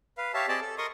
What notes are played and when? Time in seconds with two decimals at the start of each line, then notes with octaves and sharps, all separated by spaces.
0.18 B4 F5
0.34 G4 C#5 E5 F5 A5
0.48 C4 G4 G#4 D5 D#5 A5
0.61 A4
0.78 A#4 D#5 C6 C#6 D#6